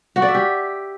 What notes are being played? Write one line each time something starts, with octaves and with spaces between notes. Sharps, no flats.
F#4
D5
E5
G4